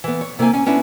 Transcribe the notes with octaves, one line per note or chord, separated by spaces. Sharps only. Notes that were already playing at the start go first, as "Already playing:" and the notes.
E3 B3
C#5
C3 A#3 E4 G#5
C#4 G#5
B3 C#4 D4 E4